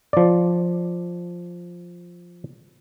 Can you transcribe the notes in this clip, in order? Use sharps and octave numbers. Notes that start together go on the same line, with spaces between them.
F3 D5